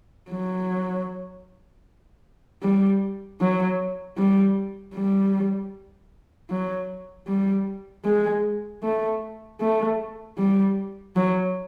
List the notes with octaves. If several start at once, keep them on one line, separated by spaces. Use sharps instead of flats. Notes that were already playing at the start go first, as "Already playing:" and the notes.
F#3
G3
F#3
G3
G3
F#3
G3
G#3
A3
A3
G3
F#3